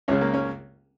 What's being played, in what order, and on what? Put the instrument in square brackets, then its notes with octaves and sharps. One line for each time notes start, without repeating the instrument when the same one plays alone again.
[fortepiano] C#2 C#3 C#4
A#3
C#4